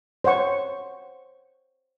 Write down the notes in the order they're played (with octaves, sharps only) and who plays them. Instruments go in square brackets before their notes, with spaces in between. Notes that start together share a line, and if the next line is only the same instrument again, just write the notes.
[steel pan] C5 C#5 F#5 C#6